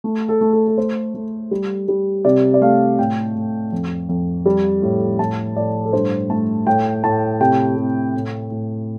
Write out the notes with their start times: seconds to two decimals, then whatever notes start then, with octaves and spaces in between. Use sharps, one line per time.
0.04 A3
0.29 A4
0.41 A3
0.53 A4
0.67 A4
0.78 A3 C5
1.14 A3
1.51 G3
1.88 G3
2.25 C3 D5
2.54 D5
2.61 A3 F5
2.99 A2 G5
3.35 A2
3.72 F2
4.09 F2
4.46 G3
4.82 A2
5.19 A2 A5
5.56 A2 D5
5.85 A4
5.93 G2 C5
6.30 A3 A5
6.67 A2 G5
7.03 A2 A5
7.40 C3 G5
7.77 C3
8.14 A2
8.51 A2